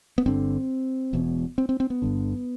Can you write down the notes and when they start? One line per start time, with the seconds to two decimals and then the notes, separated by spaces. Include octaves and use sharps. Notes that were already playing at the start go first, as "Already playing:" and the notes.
0.18 B3
0.26 G1 G2 D3 C4
1.13 E1 E2 B2
1.58 C4
1.69 C4
1.80 C4
1.90 B3
2.02 G1 G2 D3